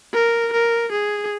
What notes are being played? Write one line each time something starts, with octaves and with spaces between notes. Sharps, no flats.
A#4
A#4
G#4